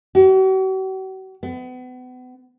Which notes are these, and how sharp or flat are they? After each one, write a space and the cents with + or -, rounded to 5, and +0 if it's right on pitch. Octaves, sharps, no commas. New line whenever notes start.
F#4 +45
B3 +35